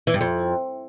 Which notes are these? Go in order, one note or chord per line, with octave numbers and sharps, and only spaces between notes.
E3
G2
F2